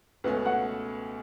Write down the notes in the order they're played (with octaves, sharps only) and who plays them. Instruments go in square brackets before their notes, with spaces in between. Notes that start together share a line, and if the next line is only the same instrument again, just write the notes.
[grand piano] C#2 B2 A3 C#4 [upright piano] B4
[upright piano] F#5